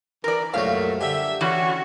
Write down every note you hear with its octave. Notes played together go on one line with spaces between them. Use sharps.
E3 A#4 D5
C2 F#2 A#2 A3 F#4 F5
D3 G4 E5
E3 C#4 F#4